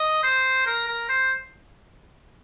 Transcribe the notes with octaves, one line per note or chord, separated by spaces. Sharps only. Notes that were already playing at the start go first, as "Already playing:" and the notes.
Already playing: D#5
C5
A#4
A#4
C5